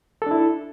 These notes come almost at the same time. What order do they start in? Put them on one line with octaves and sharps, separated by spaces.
A4 D4 E4